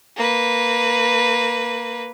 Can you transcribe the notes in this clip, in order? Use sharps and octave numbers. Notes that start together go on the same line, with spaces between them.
A#3 B4